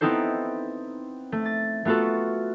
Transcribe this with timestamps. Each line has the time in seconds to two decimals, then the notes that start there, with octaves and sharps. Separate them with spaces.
0.01 B3 C4 D#4 E4 A4 C5
1.32 A3
1.46 A6
1.85 A3 B3 F4 F#4 A4